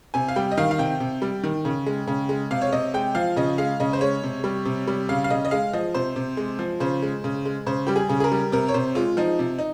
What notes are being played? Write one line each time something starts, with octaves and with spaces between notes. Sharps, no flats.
C3 G#5
F5
G3 G5
D#5
D#3 F5
F5
C3 G5
C3
G3
D#3
C#3
G#3
C#3
G#3
C3 F5
C#5
C3 D#5
G#3 G5
F3 F5
C#3 D#5
G#3 F5
C#3 D#5
C5
G#3 C#5
C3
G3
C3
G3
C#3 F5
F5
C#3 D#5
D#5
G#3 F5
F3 D#5
C3 C5
C3
G#3
F3
C#3 C5
G#3
C#3
G#3
C#3 C5
G3 G4
G#4
C#3
G#4
A#4
G3
C3 A#4
C#5
C3 C5
G#3 F4
F3 D#4
C3
D#4